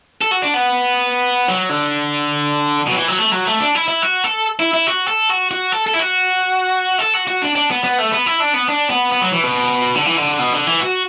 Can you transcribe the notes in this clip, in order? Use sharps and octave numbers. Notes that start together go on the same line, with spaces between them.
A4
F#4
D4
B3
F#3
D3
B2 F#3
E3
F#3
A3
F#3
A3
D4
E4
E4
F#4
A4
E4
E4
F#4
A4
F#4
F#4
A4
A4
E4
F#4
A4
F#4
F#4
D4
D4
B3
B3
A3
B3
E4
D4
B3
D4
B3
B3
F#3
E3
B2
D3
E3
D3
B2
D3
E3
F#4